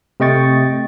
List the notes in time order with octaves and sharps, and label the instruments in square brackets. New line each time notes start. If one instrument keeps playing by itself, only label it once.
[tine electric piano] C3 A3 D#5 G5 C#6 A6